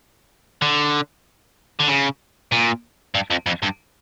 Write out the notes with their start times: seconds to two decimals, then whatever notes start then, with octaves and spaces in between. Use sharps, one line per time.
0.62 D3
1.80 D3
1.89 C#3
2.52 A#2
3.15 G2
3.31 F2
3.46 F2
3.62 G2